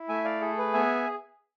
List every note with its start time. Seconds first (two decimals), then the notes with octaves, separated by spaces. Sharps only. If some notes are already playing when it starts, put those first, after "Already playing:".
Already playing: E4
0.08 A3 E5 G#5
0.24 D5 F5
0.41 G#4 A4
0.58 B4
0.73 B3 E5 G#5